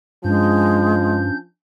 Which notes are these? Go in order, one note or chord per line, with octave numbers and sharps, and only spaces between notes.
G2 F3 G#3 C#4 D4 G6